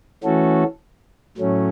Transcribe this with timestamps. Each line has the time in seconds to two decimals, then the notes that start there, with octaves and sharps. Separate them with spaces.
0.24 E3 A3 C#4 F#4 A4
1.37 A2 F#3 A3 C#4